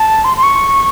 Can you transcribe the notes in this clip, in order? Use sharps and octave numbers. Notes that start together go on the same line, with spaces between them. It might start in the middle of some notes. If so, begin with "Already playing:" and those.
Already playing: A5
C6
C6
C#6